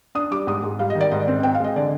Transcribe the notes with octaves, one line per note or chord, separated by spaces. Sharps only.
D4 D#6
G3 D6
G#2 D#6
G#2
G3 F5
D#5
D#3
D5
G#2 D#5
C4
C4 G5
F5
G#3 D#5
D3 D5